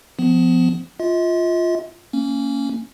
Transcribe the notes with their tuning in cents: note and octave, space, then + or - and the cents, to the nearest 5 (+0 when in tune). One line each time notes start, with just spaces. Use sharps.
F3 +0 B3 +30
F4 +0 D#5 +45
A#3 -25 C#4 +0